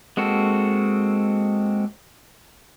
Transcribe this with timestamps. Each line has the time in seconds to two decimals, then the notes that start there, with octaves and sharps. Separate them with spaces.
0.17 G#3 A#3 C4 F#4 A4